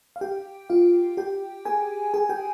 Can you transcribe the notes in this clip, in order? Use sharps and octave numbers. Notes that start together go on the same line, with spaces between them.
F5
G4 G5
F4 F5
G4 G5
G#4 G#5
G#4 G#5
G4 G5